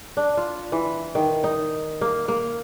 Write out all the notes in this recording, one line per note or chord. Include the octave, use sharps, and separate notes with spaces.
D4
F4
E3
D#3
D#4
A#3
A#3